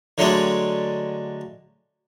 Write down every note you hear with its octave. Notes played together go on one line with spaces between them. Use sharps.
D3 F#3 G#3 A3 D4